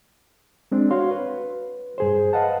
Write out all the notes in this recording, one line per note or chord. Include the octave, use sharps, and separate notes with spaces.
G#3 C4 D4
F#4 C#5 F5 C6
B4
G2 G#4 C5
B4 D#5 F5 F#5 A5